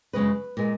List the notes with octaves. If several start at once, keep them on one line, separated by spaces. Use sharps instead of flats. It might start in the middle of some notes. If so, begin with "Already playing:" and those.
F#2 C#3 G#3 B4
A#2 G#3